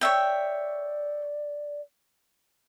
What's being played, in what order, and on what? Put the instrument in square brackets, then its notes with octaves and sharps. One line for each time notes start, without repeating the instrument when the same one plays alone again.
[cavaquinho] C#5 E5 G5 [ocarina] D5